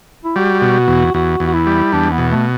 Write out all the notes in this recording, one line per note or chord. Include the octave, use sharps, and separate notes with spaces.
E4
G3 F#4
B2
E2
E2 F#4
E2
F#4
E4
G3
E2 D4
B3
B2
A3